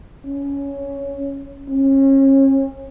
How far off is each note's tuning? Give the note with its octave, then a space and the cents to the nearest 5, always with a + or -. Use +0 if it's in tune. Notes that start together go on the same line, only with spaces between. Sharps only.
C#4 +10
C#4 -35